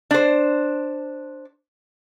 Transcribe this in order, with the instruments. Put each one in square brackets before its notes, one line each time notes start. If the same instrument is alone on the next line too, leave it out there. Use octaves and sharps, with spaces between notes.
[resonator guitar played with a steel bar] D4 C5